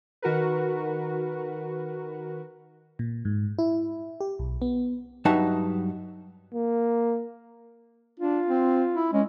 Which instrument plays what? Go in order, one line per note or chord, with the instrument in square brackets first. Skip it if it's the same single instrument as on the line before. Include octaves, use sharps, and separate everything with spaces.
[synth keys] D#3 F#4 A#4 B4
[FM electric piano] A#2
G#2
E4
G4
B1
B3
[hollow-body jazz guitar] G2 F#3 D#4 B4 E5 A5
[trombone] A#3
[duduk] D4 [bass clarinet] F4
[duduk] C4
E4
[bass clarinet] G#3 [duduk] C#4